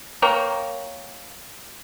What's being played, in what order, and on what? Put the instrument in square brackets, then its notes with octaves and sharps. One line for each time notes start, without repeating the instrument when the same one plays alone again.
[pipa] A#3 A#4 C#5 G5